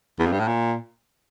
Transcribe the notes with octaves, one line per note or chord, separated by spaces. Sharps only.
E2
F2
G2
A2
A#2